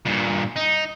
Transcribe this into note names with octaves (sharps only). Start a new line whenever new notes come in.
G2 A#2
D#4